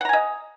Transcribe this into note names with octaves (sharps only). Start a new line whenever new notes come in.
D#5 F#5 G#5 A#5